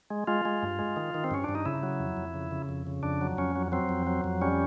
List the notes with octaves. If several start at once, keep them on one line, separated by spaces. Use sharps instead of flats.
G#3
G#3 F4
G#3
G2
G#3
D#3
D#3
C4
G2 C#4
G2 D4
D#4
C#3 E4
F#3
F2
F2
C#3
C#3
F2
C#3
F2 D4
F#3
F2 C#4
F#3
F#3 C4
F2
F#3
F2
G3 C#4